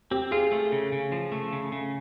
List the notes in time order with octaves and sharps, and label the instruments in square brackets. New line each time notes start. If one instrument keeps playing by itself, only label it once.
[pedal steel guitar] C4 [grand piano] G4
[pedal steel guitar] F4 [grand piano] G#4
[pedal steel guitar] A3
C#3
C#3
F3
A3
C#3
C#3